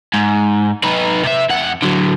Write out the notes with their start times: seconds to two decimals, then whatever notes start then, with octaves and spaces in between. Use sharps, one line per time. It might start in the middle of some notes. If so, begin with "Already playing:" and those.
0.14 G#2
0.84 D#4 B4
1.24 C3 E5
1.50 F2 F#5
1.82 D3 F#3